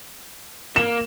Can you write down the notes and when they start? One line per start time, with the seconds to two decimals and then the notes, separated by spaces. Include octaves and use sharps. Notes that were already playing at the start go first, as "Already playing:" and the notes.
0.76 A#3 E7